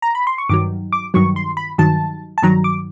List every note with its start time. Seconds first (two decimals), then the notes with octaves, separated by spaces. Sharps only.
0.02 A#5
0.15 B5
0.27 C6
0.38 C#6
0.49 G2 D#3 F#3 D6
0.93 D6
1.14 G2 D#3 F#3 C#6
1.36 C6
1.57 B5
1.78 G2 D#3 F#3 A5
2.38 A5
2.42 G2 D#3 F#3 A#5
2.64 D6